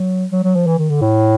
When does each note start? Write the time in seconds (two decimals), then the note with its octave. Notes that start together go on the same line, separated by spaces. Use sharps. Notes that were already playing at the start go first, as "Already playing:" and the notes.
Already playing: F#3
0.32 F#3
0.44 F#3
0.55 F3
0.67 E3
0.78 D#3
0.90 D3
1.01 A2